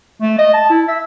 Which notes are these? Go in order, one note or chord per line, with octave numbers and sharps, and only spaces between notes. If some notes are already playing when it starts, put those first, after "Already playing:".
A3
D#5
A5
E4
E5